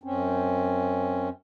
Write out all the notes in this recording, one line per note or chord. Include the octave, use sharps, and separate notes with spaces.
F#2 C4 C#4